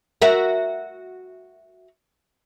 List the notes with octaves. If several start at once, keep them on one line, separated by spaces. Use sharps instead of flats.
F#4 A#4 E5